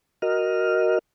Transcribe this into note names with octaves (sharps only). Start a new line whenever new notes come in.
F#4 A#4 D#5 F6